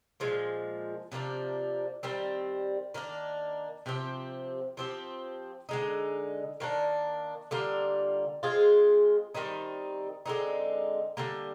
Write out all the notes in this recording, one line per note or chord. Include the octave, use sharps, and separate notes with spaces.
A#2 F3 G#3
C3 F3 A#3 D4
D#3 G3 C4
D#3 A#3 D4
C3 F3 C4 G4
F3 C4 G4
D3 G#3 D#4
D#3 A#3 D4
D3 G3 A#3 F4
G#3 C4 F4 G#4
D#3 G3 C4 D#4
D3 G#3 C4 D#4
D3 G3 A#3